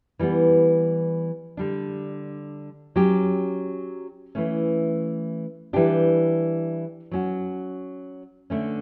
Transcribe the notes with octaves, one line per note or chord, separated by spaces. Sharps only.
E3 G3 B3
D3 G3 D4
F#3 C#4 G4
E3 A3 C#4
E3 G3 D4 G4
F#3 C#4 F#4
D3 A3 C#4